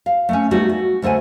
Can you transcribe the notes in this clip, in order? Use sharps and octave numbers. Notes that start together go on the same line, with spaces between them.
F5
A3 A#3 C#4
G3 A3 B3 D#4 F#4
F#4
D2 A3 C5 F#5 G#5